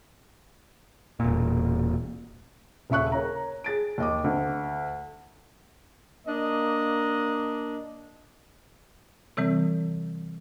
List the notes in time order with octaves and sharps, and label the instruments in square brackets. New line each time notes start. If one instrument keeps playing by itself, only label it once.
[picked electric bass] E1 A#2
[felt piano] D#1 C#3 E5 C#6 F#6
A#4 C#5 A#5
G#4 A6 D7
D#2 D#5 D6
D2
[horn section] A#3 D4 D#5
[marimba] C3 E3 G3 C4